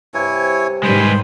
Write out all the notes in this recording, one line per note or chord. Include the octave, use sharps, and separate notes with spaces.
G2 C3 E4 C#5 G#5
G#2 D#3 G3 G#3 B4 C5 B5 C6